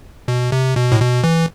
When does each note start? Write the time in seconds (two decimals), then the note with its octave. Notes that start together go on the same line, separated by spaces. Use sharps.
0.28 B2
0.52 C3
0.76 B2
0.92 A2
1.00 B2
1.24 E3